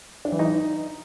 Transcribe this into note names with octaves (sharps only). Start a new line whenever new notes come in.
D4
E3
D#4